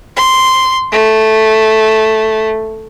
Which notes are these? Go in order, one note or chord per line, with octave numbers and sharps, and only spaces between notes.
C6
A3